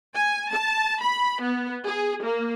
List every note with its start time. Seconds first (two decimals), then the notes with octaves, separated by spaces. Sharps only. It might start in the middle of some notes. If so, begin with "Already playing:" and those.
0.15 G#5
0.51 A5
1.02 B5
1.43 B3
1.87 G#4
2.24 A#3